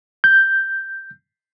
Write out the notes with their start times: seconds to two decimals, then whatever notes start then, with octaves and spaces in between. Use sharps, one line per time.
0.24 G6